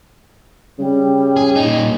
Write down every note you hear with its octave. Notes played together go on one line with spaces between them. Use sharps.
C#3 G3
G#4
A#2 D#4